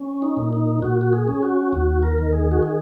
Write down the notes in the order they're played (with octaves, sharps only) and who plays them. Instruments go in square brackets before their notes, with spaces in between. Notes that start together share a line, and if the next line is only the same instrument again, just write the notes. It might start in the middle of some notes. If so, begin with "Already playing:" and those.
Already playing: [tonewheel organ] C#4
D#4
A#2
D#4
A#2 F#4
F#4
G#4
C#4
F#4
D#2 F#4
A#4
D#3
G#4
F#4
G#4